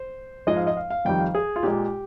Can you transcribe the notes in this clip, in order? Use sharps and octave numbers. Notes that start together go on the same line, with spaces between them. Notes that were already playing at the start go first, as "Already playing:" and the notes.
Already playing: C5
G#2 F3 G#3 D#5
F5
D#5
F5
F5
F2 D#3 G3 G5
F5
G#4
F4
A#2 G#3 G4